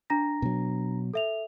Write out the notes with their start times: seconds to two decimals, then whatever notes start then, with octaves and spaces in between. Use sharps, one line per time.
0.10 D4 A#5 A#6
0.42 B2 F#3
1.14 A4 E5 F7